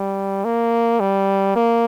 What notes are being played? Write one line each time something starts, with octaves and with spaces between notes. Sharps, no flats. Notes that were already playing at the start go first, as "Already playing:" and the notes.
Already playing: G3
A#3
G3
A#3